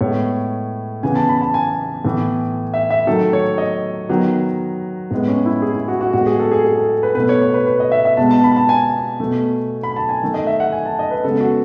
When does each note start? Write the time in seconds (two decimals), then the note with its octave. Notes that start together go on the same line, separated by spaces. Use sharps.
0.01 A2 G#3 B3 C#5
1.03 C#3 E3 B3 G#5
1.16 A5
1.29 B5
1.41 A5
1.54 G#5
2.05 A2 E3 B3
2.74 E5
2.90 E5
3.07 D#3 F#3 A3 A4
3.33 C#5
3.58 D#5
4.09 D#3 F#3 B3
5.11 A2 G#3 B3
5.28 C#4
5.46 E4
5.62 G#4
5.75 E4
5.88 F#4
6.01 F#4
6.13 A2 G#3 B3 F#4
6.27 G#4
6.39 A4
6.52 G#4
6.65 G#4
6.78 A4
7.03 B4
7.15 B2 A3 B4
7.29 C#5
7.41 C#5
7.54 B4
7.67 B4
7.80 D#5
7.92 E5
8.05 E5
8.17 B2 G#3 B3 A5
8.31 A5
8.44 B5
8.56 A5
8.69 G#5
9.20 B2 A3
9.83 B5
9.96 A5
10.09 G#5
10.23 D#3 A3
10.34 D#5
10.47 E5
10.60 F#5
10.72 G#5
10.85 A5
10.99 D#5
11.11 B4
11.24 C#3 G#3 B3 A4
11.41 F#4